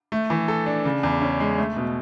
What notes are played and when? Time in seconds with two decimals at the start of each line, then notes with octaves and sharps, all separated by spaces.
0.12 A3
0.30 E3
0.48 A4
0.66 D4
0.85 C#3
1.03 E2
1.22 C#4
1.40 G#3
1.58 A3
1.76 B2